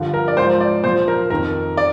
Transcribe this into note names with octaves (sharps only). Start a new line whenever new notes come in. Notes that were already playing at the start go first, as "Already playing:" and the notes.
Already playing: G2 D3 F3
A#4
D5
G#2 F3 C5
D5
A#2 F3 C5
A#4
F2 D#3 A#4
D5